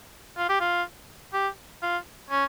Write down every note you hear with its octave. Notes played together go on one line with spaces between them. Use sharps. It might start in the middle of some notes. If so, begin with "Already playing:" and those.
F4
G4
F4
G4
F4
C#4